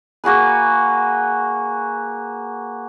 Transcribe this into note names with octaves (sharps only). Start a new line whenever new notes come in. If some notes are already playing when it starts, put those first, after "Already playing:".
A#3 F#4 G#4 B4